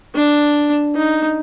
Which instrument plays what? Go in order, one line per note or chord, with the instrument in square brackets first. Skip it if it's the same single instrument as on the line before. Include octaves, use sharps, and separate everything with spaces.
[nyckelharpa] D4
D#4